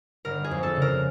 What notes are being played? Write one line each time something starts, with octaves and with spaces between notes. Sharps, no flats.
G1 A#4
G#4
F2
A4
C#3
A#4